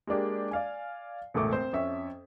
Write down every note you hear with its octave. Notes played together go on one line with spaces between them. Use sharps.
G#3 A#3 D4 G4
D5 F5 G#5
E1 C#2 A2 A3 D6
C4 C5
F2 C#4 E5